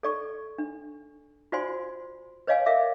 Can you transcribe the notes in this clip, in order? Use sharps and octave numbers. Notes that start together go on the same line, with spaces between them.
A4 D5 C#6
D4
F4 F#4 C5 D5 G#5 C6
B4 C#5 D#5 F5 G#5
A#4 E5 F5 D6